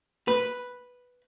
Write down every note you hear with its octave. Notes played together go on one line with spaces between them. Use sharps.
B4